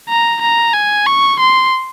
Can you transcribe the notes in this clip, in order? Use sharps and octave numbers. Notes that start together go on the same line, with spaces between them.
A#5
A#5
G#5
C#6
C6